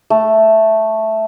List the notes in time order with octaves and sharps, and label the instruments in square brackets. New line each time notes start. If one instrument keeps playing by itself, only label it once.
[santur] A3